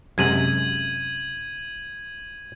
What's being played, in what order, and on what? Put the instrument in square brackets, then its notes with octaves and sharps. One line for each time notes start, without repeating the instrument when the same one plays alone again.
[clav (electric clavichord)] F#2 C3 G#3 [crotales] G#6 D#7 F#7